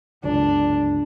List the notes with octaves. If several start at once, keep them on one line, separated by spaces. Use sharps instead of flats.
G1 C#2 F#2 D4